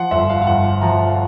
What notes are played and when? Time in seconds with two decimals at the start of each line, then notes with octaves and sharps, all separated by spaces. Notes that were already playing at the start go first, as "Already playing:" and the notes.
Already playing: F3 F#5 C6
0.11 G1 E5
0.30 F5
0.42 F5
0.47 G1 F#5
0.82 F3 A#5